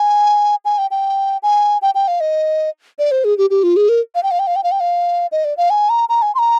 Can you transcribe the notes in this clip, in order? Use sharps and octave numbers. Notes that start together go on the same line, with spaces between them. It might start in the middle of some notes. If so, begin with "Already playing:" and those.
Already playing: G#5
G#5
G5
G5
G#5
G5
G5
F5
D#5
D5
C5
G#4
G4
G4
F4
G#4
A#4
F5
G5
F5
G5
F5
G5
F5
G5
F5
D#5
D5
F5
G#5
A#5
A#5
G#5
C6
A#5